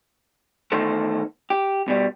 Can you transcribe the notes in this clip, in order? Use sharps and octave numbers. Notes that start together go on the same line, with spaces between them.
E2 D#3 A3 A4 C5
G4
B2 G3